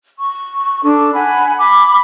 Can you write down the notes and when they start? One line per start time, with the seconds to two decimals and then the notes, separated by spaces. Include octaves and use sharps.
0.18 C#6
0.83 D4 A4
1.14 F#5 G#5 B5
1.59 B5 D6